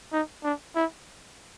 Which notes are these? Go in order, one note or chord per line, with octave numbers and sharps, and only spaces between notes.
D#4
D4
E4